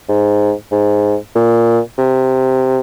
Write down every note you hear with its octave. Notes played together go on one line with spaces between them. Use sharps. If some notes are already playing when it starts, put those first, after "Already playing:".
G#2
G#2
A#2
C3